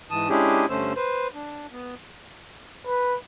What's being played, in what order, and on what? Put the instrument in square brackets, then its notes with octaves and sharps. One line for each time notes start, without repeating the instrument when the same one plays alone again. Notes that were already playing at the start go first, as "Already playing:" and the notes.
[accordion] G#2 E3 A5 D#6
G#3 C#4 D4 E4 G4 G#4
G2 D3 A3 C#4 C5 E6
B4 C5
D4
B3
[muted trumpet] B4